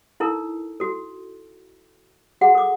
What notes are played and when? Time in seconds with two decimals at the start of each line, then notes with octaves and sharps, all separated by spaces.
0.20 D#4 E4 A4 A#4
0.80 F#4 A4
2.41 F#4 G#4 F#5
2.55 A4 D6